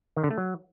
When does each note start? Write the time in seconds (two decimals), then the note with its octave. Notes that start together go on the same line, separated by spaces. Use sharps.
0.17 D#3
0.24 D3
0.31 A3
0.38 F#3